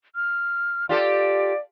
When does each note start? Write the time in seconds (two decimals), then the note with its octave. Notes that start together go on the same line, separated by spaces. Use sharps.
0.15 F6
0.89 F4 G4 A4 D5